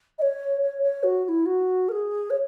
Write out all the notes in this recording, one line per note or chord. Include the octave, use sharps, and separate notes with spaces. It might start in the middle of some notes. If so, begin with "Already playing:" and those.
D#5
C#5
C#5
C#5
F#4
F#4
E4
F#4
A#4
G#4
C#5